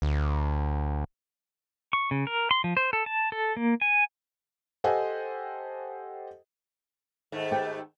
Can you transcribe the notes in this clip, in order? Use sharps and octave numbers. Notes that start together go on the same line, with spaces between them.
D2
C#6
C#3
A#4
C6
F3
C5
A4
A5
A4
A#3
G#5
G4 A4 C5 D#5 F#5 G#5
G#2 D#3 A3
G4 B4 G5